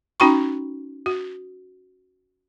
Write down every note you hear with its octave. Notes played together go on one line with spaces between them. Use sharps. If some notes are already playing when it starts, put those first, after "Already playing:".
C#4 D#4 F#4 G5 B5 C#6
F#4